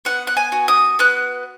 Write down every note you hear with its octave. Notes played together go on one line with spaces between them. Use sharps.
B3 F#5
F#5
G#5
F#4
D#6
B3 F#6